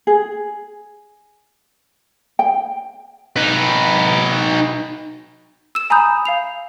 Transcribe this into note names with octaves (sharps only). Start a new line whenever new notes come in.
G#4
G5
D#4 B4
E6 E7
G#5 A#5 B5 D#6 G6
F5 C7 F7